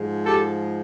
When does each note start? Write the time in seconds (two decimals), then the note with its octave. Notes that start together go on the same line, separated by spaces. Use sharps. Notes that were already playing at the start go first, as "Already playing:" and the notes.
Already playing: G#2 F3
0.26 G4 A4